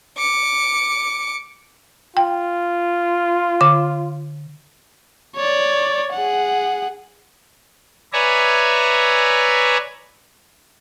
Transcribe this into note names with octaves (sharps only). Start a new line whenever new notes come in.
D6 C#7
F4 G5
D3 D6
C#5 D5
G#4 F#5
B4 C#5 D5 E5 G#5 A#5